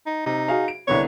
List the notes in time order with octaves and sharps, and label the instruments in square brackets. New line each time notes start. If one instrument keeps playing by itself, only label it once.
[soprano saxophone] D#4
[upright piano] C3 [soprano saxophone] D#4
[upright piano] F#4 G#4 F5
D7
[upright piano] C2 D3 B3 [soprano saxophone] C#5